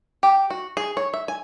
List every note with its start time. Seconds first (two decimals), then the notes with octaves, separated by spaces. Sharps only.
0.23 G4
0.50 F#4
0.77 G#4
0.97 C#5
1.14 E5
1.28 G#5